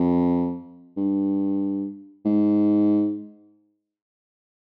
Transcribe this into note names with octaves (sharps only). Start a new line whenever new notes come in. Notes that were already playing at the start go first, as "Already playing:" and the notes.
Already playing: F2
G2
G#2